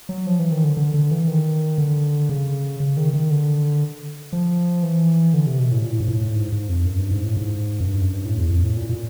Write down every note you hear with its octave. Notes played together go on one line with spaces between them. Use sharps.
F#3
F3
E3
D#3
D3
D3
D3
E3
D#3
D3
C#3
C#3
D#3
D#3
D3
F3
E3
D3
C3
B2
A2
A#2
A2
G#2
A2
G#2
G#2
F2
F#2
G2
G#2
A2
G#2
F#2
G2
F#2
G2
A2
E2
F2
A2
A#2
A#2